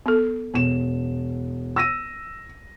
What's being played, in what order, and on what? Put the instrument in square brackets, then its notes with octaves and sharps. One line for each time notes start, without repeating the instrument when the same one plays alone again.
[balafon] B3 A4
[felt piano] E1 E7 [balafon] B3
[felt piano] E6 A#6 D#7